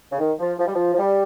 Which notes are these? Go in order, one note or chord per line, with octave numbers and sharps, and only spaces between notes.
C#3
D#3
F3
F3
G3
F3
F3
G3